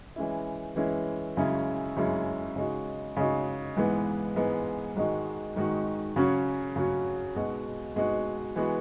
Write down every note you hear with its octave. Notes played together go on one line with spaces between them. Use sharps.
E3 G#3 C#4 E4
E3 G#3 C#4 E4
F#2 C#3 G#3 C#4 E4
F#2 C#3 G#3 C#4 E4
C#3 G#3 D#4 F#4
C#3 G#3 D#4 F#4
G#2 E3 G#3 B3
G#2 E3 G#3 B3
G#2 D#3 G#3 D#4 F#4
G#2 D#3 G#3 D#4 F#4
C#3 F#3 C#4 F#4
C#3 F#3 C#4 F#4
B2 G#3 D#4 F#4
B2 G#3 D#4 F#4
E3 G#3 B3 F#4